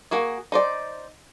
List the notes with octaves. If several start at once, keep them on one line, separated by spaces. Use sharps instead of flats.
A#3 F#4 G#4
D#4 C5 D5